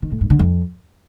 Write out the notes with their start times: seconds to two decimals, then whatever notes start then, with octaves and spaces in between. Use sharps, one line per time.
0.02 D#3
0.12 A2
0.21 G2
0.30 D3
0.39 F2